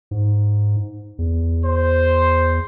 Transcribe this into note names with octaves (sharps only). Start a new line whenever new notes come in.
G#2
E2
C5